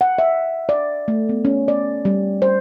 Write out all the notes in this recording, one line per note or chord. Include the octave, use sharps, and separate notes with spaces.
F#5
E5
D5
A3
B3
C#4
D5
G3
C5